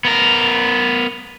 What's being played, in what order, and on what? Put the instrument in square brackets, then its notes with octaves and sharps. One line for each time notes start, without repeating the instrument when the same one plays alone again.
[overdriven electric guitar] B3 A#4